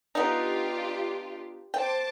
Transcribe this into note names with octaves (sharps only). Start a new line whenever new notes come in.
B3 D4 D#4 F4 G4
C5 G5 A5 D6